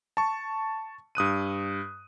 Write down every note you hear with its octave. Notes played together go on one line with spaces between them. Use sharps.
A5 C#6
G2 D#6 F#6 D#7